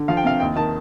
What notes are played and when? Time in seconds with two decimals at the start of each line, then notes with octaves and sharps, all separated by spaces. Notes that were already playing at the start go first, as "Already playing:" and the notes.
Already playing: D3
0.08 F3 F5
0.17 G5
0.24 C3 F5
0.40 D#2 G5
0.56 D#3 A5